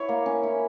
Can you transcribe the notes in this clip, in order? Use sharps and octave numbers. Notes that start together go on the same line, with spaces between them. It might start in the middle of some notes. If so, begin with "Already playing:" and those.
Already playing: E4 C#5
A#3
C#4
E4